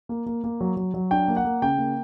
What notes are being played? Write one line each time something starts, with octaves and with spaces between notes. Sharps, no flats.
A#3
A#3
A#3
F#3
F#3
F#3
D4 G5
A#3
F#5
A#3
C#3 G5
A#3